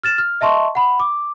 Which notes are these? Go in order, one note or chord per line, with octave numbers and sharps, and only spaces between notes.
F6 A6 E7
F6
D#5 E5 A5 C6 C#6
F#5 B5
D6